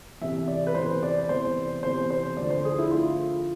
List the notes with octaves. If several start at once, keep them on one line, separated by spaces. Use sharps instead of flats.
E2 C3 E3 E5
D5
B4
E2 C3 E3 C5
D5
E2 C3 E3 C5
E2 C3 E3 C5
C5
D2 D3 F3 D5
C5
G#4
E4
D2 D3 F3 F4